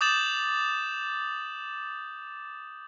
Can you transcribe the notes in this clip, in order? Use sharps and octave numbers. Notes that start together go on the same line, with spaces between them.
D6 D#6 G6 A6 E7 F#7